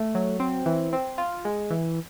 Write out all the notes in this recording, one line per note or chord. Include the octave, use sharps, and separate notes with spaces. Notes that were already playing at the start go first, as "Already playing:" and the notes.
Already playing: A3
F#3
C4
E3
C4
F4
G#3
E3